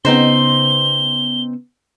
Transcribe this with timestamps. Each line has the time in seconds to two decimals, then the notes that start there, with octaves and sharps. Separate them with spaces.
0.05 C#3 B3 C4 D#4 C5 G7